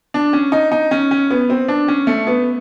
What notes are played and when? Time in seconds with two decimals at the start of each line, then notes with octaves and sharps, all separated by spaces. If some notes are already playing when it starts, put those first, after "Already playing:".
0.14 D4
0.33 C#4
0.52 D#4
0.72 D#4
0.91 C#4
1.11 C#4
1.30 B3
1.50 C4
1.68 D4
1.88 C#4
2.07 A3
2.27 B3